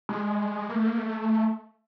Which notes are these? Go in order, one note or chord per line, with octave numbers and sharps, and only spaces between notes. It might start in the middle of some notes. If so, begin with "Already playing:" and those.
G#3
A#3
A3
A#3
A3